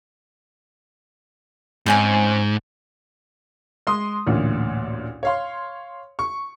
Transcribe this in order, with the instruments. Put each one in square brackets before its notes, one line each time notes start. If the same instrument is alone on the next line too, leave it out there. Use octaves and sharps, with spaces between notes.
[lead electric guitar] G#2 [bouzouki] C4 C#4 G#5
[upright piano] G#3 C6 D#6
A1 D2 A#2
C#5 F5 C6
C#6